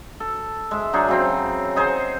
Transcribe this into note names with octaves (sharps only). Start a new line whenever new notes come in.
A4
G#3 E5
F#3 D4 D#4 G#4
C#3 F#3 C4
D#4 G#4 C5